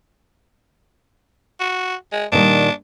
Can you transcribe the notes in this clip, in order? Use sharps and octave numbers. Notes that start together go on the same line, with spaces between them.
F#4
G#3
A#2 D#3 G3 D4